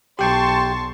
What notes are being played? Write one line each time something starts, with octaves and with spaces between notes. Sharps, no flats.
B1 G4 G5 A5 C6 C#6